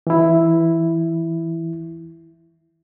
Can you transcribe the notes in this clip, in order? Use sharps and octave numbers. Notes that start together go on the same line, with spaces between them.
E3 E4